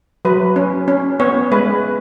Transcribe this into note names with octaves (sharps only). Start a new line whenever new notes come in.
F#3 B4
C#4
C#4
B3 C#5
G#3 B4